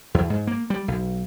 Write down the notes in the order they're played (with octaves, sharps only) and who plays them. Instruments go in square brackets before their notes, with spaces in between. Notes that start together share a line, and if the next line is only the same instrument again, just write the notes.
[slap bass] E2
G#2
A#3
G3
B1